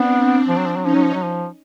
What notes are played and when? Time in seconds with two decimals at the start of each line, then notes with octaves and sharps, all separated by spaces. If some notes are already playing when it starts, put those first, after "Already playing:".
Already playing: B3 C4 D4
0.48 F3
0.58 F#3
0.68 F3
0.76 F#3
0.82 F3 C#4 D#4
0.95 F#3
1.04 F3
1.14 F#3
1.23 F3